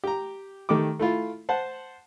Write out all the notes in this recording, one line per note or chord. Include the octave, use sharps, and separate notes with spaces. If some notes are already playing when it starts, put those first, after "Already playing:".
G4 A#5
D#3 A3 G4 D6
A3 E4 F4
C5 F#5 A5